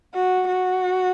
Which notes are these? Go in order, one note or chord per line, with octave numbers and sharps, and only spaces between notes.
F#4
F#4